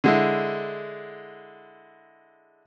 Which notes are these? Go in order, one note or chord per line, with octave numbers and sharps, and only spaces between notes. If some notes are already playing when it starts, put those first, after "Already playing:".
D3 G#3 E4